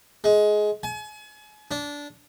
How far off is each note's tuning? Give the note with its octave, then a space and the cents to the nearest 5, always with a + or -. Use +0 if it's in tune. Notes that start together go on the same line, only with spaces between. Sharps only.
G#3 +15
G#5 +40
D4 -15